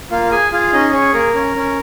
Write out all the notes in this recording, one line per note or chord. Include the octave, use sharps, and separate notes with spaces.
A#3 F4 F5
G#4 G#5
F4 G#4 F5
C#4 D#4 D#5
G#4 C#5
A#3 A#4
C#4
C#4